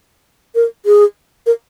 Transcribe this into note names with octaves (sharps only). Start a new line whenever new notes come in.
A#4
G#4
A#4